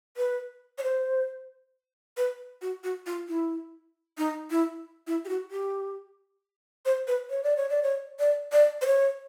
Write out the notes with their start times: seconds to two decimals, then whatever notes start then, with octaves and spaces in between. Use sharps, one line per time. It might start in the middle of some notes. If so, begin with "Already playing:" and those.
0.17 B4
0.78 C#5
0.83 C5
2.17 B4
2.62 F#4
2.84 F#4
3.06 F4
3.29 E4
4.18 D#4
4.51 E4
5.07 E4
5.25 G4
5.29 F#4
5.51 G4
6.85 C5
7.08 B4
7.30 C#5
7.43 D5
7.57 C#5
7.69 D5
7.83 C#5
8.19 D5
8.52 D5
8.82 C5
8.86 C#5